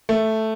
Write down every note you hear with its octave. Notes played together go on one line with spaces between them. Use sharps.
A3